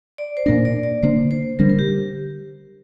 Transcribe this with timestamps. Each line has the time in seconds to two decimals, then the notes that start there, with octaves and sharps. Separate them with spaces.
0.18 D5
0.37 C5
0.46 A#2 A#3 D4 A#4
0.65 D5
0.83 D5
1.03 D3 A#3 D4 C5
1.31 C5
1.59 D3 G3 D4 A#4
1.70 A#4
1.79 G4